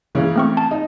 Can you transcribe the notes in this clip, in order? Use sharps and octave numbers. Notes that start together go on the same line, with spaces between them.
C#3 E3 A#3
A3 C4 C#6
A5
D#4